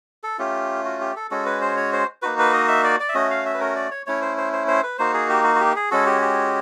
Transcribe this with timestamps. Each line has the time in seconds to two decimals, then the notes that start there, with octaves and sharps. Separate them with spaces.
0.24 A4
0.38 A3 C#4 F4 G4
0.85 F#4
1.01 G4
1.16 A4
1.31 G#3 C#4 F#4 A4
1.46 B4
1.61 C5
1.77 C#5
1.93 C5
2.22 A#3 D#4 F#4 B4
2.39 B4
2.53 D#5
2.68 E5
2.84 D5
3.00 D5
3.09 E5
3.14 A3 C#4 F#4 D#5
3.31 F5
3.46 E5
3.54 B4
3.60 A#4
3.76 D5
3.91 C#5
4.06 A3 C#4 E4 C#5
4.22 C5
4.37 C5
4.53 C5
4.68 C5
4.83 B4
4.98 A#3 D#4 F#4 C5
5.14 G#4
5.29 G4
5.44 F#4
5.55 F#4
5.60 G4
5.76 G#4
5.91 G#3 C#4 F#4 A4
6.06 G4
6.22 G4